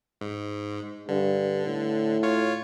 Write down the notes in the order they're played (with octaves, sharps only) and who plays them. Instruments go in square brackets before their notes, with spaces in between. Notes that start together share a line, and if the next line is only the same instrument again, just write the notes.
[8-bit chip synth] G#2
[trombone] G2 [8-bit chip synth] D3
[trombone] A2
[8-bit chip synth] F4 C#5